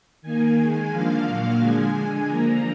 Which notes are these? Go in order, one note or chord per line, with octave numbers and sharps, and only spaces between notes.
D#3 A#3 G#5
D#3 G#3
D3 F3 A#3 F5
A#2 F#3 A#3
D3 F3 G#3 G#5
D3 G#3
D3 F3 A#3 A#5